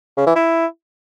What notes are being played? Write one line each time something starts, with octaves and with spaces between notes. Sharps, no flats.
C#3
E3
E4